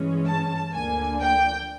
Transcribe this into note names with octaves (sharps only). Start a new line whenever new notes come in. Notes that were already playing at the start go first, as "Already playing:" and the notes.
Already playing: G2 E3 G#3 C#4
A5
D2 D3 F3 A#3 D4 G#5
G5